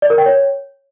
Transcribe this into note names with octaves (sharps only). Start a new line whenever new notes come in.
D5
A#4
G5
C#5